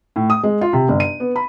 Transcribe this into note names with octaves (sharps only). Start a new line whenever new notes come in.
A2
D#6
G#3
F4
C3
G1
D#7
B3
B5